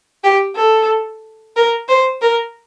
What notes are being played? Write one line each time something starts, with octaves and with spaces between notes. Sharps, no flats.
G4
A4
A#4
C5
A#4